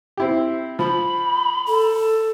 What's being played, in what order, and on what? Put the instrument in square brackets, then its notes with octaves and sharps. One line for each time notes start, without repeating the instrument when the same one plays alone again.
[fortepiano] C4 E4 G4
[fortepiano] F3 [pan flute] B5
[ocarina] A4